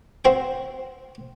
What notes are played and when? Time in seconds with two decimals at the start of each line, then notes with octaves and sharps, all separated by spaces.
0.25 C4 F#4 C5 G5